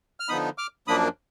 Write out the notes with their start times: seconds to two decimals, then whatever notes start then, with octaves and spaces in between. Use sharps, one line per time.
0.20 F6
0.28 D3 F3 B3 D#4 B5 D#6
0.58 D6 F6
0.87 F#2 F3 A#3 D4 B5 D#6